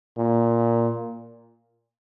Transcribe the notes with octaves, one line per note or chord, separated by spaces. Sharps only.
A#2